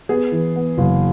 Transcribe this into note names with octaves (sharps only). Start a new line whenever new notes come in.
B3 G#4
E3
B3
F#1